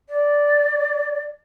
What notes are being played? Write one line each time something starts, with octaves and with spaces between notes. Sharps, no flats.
D5